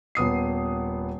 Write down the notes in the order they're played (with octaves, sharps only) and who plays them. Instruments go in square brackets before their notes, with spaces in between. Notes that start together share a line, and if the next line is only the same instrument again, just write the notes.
[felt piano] D#1 B3 D#6 C7